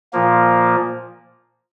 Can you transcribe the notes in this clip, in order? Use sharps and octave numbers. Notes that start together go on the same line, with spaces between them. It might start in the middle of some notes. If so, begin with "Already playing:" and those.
A#2 F3 A#3